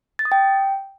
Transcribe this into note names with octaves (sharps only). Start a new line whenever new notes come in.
A6
D#6
G5